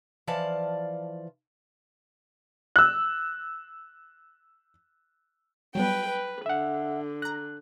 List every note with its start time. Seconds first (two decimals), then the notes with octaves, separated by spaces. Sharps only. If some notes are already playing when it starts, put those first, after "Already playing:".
0.27 E3 F3 D5 F5 A5
2.76 E6 F#6
5.75 F#3 G3 B3 B4 G5
6.08 B4
6.46 D3 E5 F#5
7.22 A#5 F#6 A#6